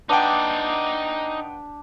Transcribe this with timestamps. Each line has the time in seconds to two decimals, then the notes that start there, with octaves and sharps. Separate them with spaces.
0.09 D4 D#4 B4 D5 F#5 G5